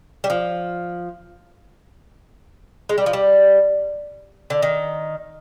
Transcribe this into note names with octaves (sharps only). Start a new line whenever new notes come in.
G3
F3
G#3
G3
F3
G3
D3
D#3